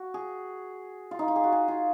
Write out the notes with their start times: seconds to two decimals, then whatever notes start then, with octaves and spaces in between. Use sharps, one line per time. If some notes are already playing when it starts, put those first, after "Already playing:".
Already playing: F#4
0.14 G#4
1.11 F4
1.19 D#4
1.28 F4
1.36 G#4
1.44 F#4
1.52 G#4
1.68 F4